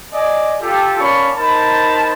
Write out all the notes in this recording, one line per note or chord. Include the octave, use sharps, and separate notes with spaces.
D5 D#5 G#5
F4 G4 A4
A#3 C#4 D5 A5 B5 C#6
D#4 A#4 C5 A5 B5